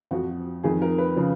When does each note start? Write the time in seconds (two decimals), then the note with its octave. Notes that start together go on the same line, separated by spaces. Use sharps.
0.11 F2 F3 F#4
0.63 F2 D#3 G#4
0.82 A#4
0.98 B4
1.16 C#3 F3